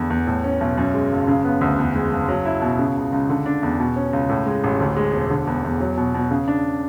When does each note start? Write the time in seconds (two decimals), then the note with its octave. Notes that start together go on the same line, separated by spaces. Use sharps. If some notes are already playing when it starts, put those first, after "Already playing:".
Already playing: E2 D3
0.10 E2
0.27 A2
0.44 C#4
0.61 B1
0.78 F#2
0.94 G#3
1.11 F#1
1.28 C#3
1.45 B3
1.61 D2
1.78 E2
1.95 G#3
2.12 F#1
2.28 F#3
2.45 E4
2.62 B2
2.79 C#3
2.96 C#2
3.12 C#2
3.29 D3
3.46 D4
3.63 E2
3.80 B2
3.96 C#4
4.13 C#2
4.29 A2
4.46 G#3
4.64 A1
4.80 D2
4.97 G#3
5.14 E1
5.30 D3
5.47 E2
5.64 E2
5.80 F#3
5.97 B2
6.14 B2
6.31 C#3
6.48 D4